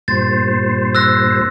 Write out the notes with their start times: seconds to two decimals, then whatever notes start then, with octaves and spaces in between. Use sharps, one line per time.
0.08 G2 A#2 C5 A6
0.95 E6 F#6 A#6